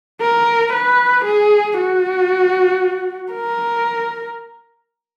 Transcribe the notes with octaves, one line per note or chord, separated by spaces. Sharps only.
A#4
B4
G#4
F#4
A#4